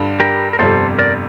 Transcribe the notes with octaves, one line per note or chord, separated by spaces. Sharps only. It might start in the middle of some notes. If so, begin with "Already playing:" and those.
Already playing: G2 D3 G3
G4 A#4
A#4
G1 F2 C3 G3 A4 C5
A#4 D5